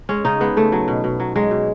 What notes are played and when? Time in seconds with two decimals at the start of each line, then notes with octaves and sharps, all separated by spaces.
0.09 G#3 C#4
0.25 C#3 D#4
0.41 G#3 B3
0.56 C#3 A3
0.72 F#3
0.88 B2
1.04 B2
1.20 F#3
1.36 F#3 G#3
1.51 B2